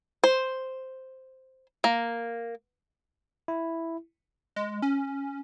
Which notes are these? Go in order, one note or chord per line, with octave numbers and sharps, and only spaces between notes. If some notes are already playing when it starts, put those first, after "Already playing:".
C5
A#3
E4
G#3
C#4